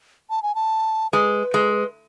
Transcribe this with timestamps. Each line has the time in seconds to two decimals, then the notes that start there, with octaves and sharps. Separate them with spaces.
0.30 A5
0.43 G#5
0.55 A5
1.13 G#3 B4
1.54 G#3